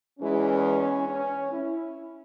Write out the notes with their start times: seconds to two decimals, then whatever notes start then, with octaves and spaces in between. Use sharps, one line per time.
0.19 E2 E3 G#3 C#4
1.08 C#4
1.51 E4